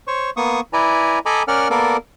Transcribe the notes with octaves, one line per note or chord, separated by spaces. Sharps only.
C5 C#5 C#6
A#3 B3 C#6 D#6
E4 B4 D5 G#5 A#5
A4 D#5 G#5 A#5 B5 D6
C#4 A#4 D5 F#5 F6
A#3 B3 A4 A#4 D5 D6